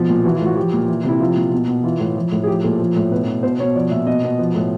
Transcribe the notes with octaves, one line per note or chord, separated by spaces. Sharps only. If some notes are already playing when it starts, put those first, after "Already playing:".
Already playing: B2 F3
A#2
E3 F#4
F4
A2 F#4
F3 G4
A#2
E3
C3 E4
F3 F4
A#2
B2
B2
E3 F4
A2
F3
A2
G#4
F3 G4
A#2 A4
F3
A2
B2 B4
B2
B2 C5
B2 C#5
F3 D5
A#2 E5
B2 D#5
B2
F3
A2